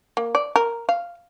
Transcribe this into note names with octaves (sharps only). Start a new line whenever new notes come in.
A#3
D5
A#4
F5